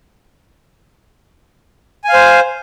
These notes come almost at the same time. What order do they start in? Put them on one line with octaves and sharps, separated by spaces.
G#5 F5 C5